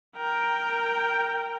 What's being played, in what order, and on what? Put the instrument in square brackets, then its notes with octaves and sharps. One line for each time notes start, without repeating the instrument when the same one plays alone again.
[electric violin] A#4 G5